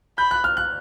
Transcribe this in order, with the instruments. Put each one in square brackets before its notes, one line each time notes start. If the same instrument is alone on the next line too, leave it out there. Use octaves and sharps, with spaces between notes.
[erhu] B5 [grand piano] G6
[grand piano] F#6
F6
F#6